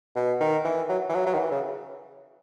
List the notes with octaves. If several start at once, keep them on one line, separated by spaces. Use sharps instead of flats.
B2
D#3
E3
F#3
E3
F#3
F#3
D#3
E3
C#3